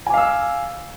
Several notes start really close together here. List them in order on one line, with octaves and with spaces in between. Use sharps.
G#5 D6 F5 E6